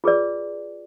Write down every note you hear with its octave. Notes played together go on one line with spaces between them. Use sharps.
F4 G#4 B4 D5